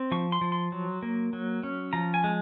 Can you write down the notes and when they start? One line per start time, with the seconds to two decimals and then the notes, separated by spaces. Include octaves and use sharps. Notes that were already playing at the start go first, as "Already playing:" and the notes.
Already playing: C4
0.12 F3 C#6
0.32 C6
0.41 F3
0.52 C6
0.72 F#3
1.03 A#3
1.33 F#3
1.63 C#4
1.93 F3 A#5
2.14 G#5
2.24 G#3